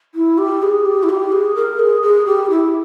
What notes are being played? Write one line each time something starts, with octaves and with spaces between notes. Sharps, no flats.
E4
G4
G#4
G4
E4
G4
G#4
A#4
G#4
G#4
G4
E4